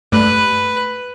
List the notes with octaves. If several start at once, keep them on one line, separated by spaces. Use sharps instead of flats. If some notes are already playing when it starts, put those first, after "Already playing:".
G2 A3 B4 F#6